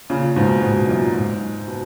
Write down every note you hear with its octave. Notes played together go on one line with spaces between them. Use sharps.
A#2 C#3
G#2 B2
G#2 B2
F#2 A#2
G#2
B2